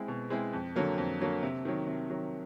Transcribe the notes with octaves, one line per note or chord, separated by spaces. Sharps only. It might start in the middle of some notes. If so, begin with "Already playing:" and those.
Already playing: G#3 C4 E4
B2
G#3 C4 E4
F2
D3 F#3 A#3
F2
D3 F#3 A#3
C3
D#3 F#3
C3
D#3 F#3